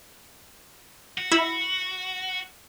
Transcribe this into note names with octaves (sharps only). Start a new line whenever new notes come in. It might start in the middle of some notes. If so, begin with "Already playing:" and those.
F#4
E4 B5 E6